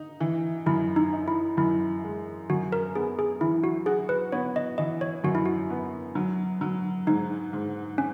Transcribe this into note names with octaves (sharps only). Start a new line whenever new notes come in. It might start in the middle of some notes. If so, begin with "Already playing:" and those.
Already playing: D#4
E3
F#2 E4
D#4
D#4
E4
F#2 E4
G#3
F#2 F#4
A#4
B3 G#4
G#4
E3 E4
F#4
F#4 G#4
B4
B3 C#5
D#5
E3 D#5
C#5
F#2 F#4
E4
F#4
B3
F#3
F#3
G#2 D#4
G#2
C#4